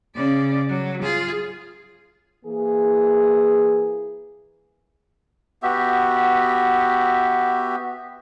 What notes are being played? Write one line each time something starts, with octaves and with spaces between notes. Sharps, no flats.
C#3 D5
F#3
F4 G#4
E3 A#3 G#4
B3 F#4 G4 E5